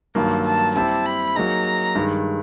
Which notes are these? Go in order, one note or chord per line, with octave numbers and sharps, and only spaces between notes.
G2 D#3 F#3 A#3 A5
A5
G3 C4 E4 G4 A5
B5
F#3 A#3 D#4 G#4 A#5
G2 D#3 G#3